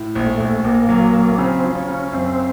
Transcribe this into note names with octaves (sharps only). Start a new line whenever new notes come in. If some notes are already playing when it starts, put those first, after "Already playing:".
Already playing: A2
A#1
A3
A#1
A#1 A#3
F#3
F#3
C#3 C4
F3
C#4
C#3
F#2 C4